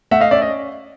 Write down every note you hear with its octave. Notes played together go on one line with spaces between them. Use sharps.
A3 E5 F#5
D#5 F5
C#4 D5 E5
D#5